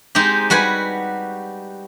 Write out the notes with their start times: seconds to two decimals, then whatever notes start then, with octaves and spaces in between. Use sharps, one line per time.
0.15 G#3 C4 D#4 G4
0.50 G3 F#4 B4 G#5